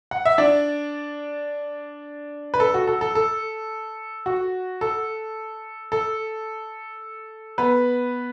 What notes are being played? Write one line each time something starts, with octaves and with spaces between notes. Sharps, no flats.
F#5
E5
D4 D5
B4
A4
F#4
A4
A4
A4
F#4
A4
A4
B3 B4